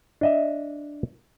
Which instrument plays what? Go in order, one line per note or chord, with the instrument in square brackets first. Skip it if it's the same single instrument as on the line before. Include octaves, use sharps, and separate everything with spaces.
[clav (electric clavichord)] D4 D#5 E5